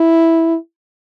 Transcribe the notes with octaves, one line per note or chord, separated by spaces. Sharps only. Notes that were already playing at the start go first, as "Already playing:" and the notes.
Already playing: E4